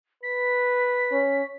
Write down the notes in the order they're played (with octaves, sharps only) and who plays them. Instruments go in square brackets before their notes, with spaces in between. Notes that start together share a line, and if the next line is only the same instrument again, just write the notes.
[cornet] B4 [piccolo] B6
[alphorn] C#4